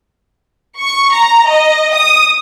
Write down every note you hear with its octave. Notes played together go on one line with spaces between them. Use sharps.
C#6
A#5
D#5
D#6